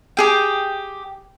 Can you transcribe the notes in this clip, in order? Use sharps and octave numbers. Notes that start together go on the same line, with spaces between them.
G4 G#4 G5